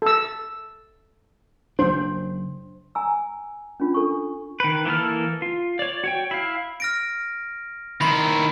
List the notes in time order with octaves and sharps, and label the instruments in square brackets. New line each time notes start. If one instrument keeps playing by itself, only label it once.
[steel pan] A4 E6
[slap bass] F#1 F#3 D4 [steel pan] C5
[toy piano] G#5 A#5 E6
C#4 D4 F4
D4 A4 C#6
[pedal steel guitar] D#3 B4
E3 A#3 A4 F6
F4
C#5 D5
F#4 C#5 G5
E4 F5
[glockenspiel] F6 A#6 D7
[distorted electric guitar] D#3 E4 [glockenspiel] B5 C6 C7